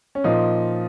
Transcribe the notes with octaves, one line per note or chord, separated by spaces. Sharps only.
C#4
A#2 F3 D#4